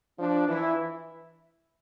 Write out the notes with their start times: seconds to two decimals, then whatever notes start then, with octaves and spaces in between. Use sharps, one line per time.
0.19 F3 D4
0.48 E3 E4